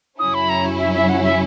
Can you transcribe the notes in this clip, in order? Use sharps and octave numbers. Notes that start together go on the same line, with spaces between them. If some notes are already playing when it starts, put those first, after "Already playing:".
F#2 C#3 F#3 C#4 E4 D#6
B5
A#5
E5
E5
F#5
E5